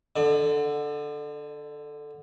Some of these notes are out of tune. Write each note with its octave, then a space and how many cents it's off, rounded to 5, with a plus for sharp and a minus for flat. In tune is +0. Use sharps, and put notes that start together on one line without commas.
D3 +0 D5 +40